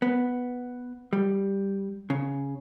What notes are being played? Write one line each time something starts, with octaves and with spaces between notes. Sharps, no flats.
B3
G3
C#3